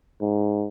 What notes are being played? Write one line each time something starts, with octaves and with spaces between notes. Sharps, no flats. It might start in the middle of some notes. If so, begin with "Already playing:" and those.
G#2